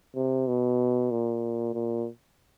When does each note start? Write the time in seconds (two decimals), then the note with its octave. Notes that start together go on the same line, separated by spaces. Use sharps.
0.15 C3
0.48 B2
1.11 A#2
1.74 A#2